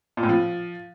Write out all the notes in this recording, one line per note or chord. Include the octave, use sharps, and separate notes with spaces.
A#2
A2
F3